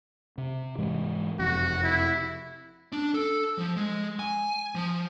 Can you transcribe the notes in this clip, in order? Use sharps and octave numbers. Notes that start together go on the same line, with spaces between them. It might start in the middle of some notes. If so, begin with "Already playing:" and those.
C3
G#2 E3 G#3
F#1 F2 C3 F#4
E4
D4
A4
F3
G#3
G#5
F3